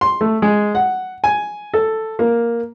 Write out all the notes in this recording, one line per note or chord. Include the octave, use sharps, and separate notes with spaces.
C6
A3
G#3
F#5
G#5
A4
A#3